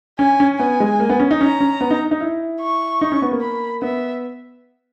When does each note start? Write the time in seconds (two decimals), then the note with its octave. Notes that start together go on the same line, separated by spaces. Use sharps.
0.19 C#4 G#5
0.40 C#4
0.59 B3 G#5
0.80 G#3
1.00 A#3
1.09 B3
1.20 C#4
1.31 D#4
1.41 C#4 A#5
1.60 C#4
1.81 B3
1.91 D#4
2.11 D#4
2.21 E4
2.61 C#6
3.01 D#4
3.12 C#4
3.22 B3
3.32 A#3
3.41 B5
3.82 B3 E5